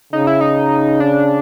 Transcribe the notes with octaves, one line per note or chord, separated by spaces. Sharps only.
C#3 D#4
E4
D#4
D4